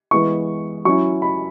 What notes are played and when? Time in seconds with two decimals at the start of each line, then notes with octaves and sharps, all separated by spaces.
0.11 E3 G#3 B3 E4 C#6
0.85 F#3 C#4 E4 C#6
1.22 B5